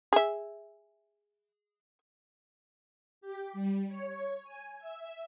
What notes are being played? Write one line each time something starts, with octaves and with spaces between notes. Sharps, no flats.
G#4 E5
G4
G3
C#5
G#5
E5